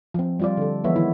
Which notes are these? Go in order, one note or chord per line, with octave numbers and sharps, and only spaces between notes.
F3 C4
G3 F4 D5
D3 A4
E3 F3 G#3 B3 C#5 E5
D#3 E4